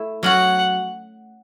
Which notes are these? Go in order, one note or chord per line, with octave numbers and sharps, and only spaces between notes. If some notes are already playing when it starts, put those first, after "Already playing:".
Already playing: A3 E4 A4 E5
F#3 C#4 F#4 F#5